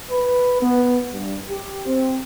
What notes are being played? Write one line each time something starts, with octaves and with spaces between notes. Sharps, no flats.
B4
B3
G2
G4
C4